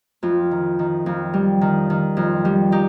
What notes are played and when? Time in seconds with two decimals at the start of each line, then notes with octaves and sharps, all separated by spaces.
0.23 F2 F4
0.51 D#3
0.79 D#3
1.06 F2
1.34 G3
1.61 D#3
1.90 D#3
2.17 F2
2.45 G3
2.72 D#4 G4